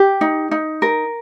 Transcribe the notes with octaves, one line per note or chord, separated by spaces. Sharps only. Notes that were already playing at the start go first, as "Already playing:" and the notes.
Already playing: G4
D#4
D#4
A#4